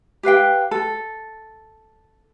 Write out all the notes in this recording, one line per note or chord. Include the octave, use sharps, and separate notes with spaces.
G4 B4 F5 G5
A4